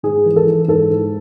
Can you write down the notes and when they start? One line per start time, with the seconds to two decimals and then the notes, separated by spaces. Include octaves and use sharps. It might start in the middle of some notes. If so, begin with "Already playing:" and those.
0.03 G#2 G#4
0.25 E3
0.36 A4
0.47 E3
0.68 G#2 A4
0.90 G#2